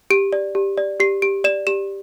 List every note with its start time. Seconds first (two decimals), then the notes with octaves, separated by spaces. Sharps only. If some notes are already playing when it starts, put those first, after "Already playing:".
0.10 G4 D7
0.33 D5
0.55 G4
0.78 D5
1.00 G4 C7
1.22 G4 D7
1.44 D5 E7
1.67 G4 E7